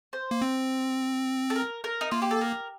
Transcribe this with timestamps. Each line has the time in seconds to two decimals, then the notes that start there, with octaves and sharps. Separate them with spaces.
0.13 C5
0.31 A#3
0.42 C4
1.50 A4
1.56 A#4
1.84 A#4
2.01 D#4
2.11 A#3 F4
2.22 G4
2.31 A4
2.41 A#4